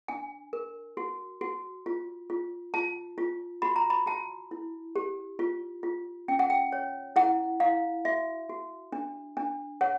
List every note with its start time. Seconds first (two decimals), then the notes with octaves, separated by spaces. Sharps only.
0.08 D4 G#5
0.53 A#4
0.97 F#4
1.41 F#4
1.86 F4
2.30 F4
2.74 F4 A5
3.18 F4
3.62 F#4 B5
3.76 A#5
3.90 B5
4.06 F#4 A5
4.51 E4
4.96 G4
5.39 F4
5.83 F4
6.28 C#4 G5
6.39 F#5
6.50 G5
6.72 C#5
7.16 E4 F#5
7.60 E4 F5
8.05 F#4 E5
8.49 F#4
8.92 D4
9.37 D4
9.81 C#5 F#5